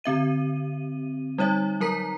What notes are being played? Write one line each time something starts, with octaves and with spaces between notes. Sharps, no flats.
D3 C4 E5 D#7
G3 D#4 C#5 E5
F#3 A#4 A#5 B6